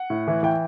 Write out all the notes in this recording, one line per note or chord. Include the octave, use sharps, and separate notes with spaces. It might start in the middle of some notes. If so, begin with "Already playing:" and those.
Already playing: F#5
A2
E3
E3 G5